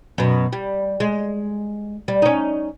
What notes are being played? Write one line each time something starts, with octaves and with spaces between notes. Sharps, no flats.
F#2 B2
G3
G#3
G3
C#4 D#4